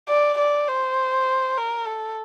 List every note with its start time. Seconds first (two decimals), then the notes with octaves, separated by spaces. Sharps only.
0.08 D5
0.38 D5
0.68 C5
1.57 A#4
1.87 A4